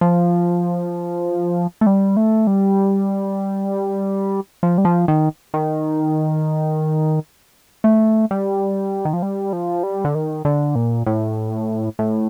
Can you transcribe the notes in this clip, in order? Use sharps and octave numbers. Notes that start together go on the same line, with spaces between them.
F3
A3
G3
A3
G3
F3
G3
F3
D#3
D#3
A3
G3
D#3
F3
G3
F3
G3
D3
D#3
D3
A#2
A2
A2